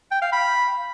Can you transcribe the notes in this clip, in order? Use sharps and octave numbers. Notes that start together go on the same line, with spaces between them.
G5
F5
B5